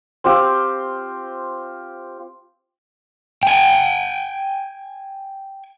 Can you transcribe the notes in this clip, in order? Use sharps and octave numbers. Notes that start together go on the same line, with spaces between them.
C4 F4 G4 G5
G5 G#5